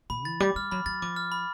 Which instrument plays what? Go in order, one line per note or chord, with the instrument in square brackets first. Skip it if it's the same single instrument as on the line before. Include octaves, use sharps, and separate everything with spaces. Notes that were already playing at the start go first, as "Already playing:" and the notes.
[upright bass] A#2 [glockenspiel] B5
[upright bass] E3 [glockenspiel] A6
[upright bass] G3 [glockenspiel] D6
[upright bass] G3 [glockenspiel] F6
[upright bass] F#3 [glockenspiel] B5
[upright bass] F#3 [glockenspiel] A6
[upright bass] F3 [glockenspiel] D6
[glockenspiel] F6
B5